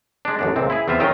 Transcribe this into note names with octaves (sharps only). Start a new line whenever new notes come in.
G#3 D4
A1 F#2 D4
C#2 A#2 C4
E4 G#4
E2 C4 F4 E5
D#3 F#3 C#4 F4 D#5 G5